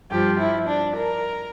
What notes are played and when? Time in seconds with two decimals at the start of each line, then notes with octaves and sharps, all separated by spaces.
0.11 G2 F3 G4
0.39 E4
0.67 D4
0.95 A#4